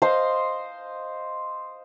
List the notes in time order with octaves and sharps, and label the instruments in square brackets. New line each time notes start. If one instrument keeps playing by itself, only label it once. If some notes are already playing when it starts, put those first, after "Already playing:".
[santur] C5 D#5 F5 C6